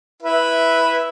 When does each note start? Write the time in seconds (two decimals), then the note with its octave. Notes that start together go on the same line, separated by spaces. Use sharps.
0.23 E4 B4 E5